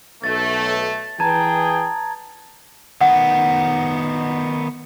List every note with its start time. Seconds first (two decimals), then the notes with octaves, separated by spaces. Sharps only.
0.24 B1 A3 A6
1.20 E3 G#4 G5 A5 A#5 G#6
3.01 D#3 B3 F#5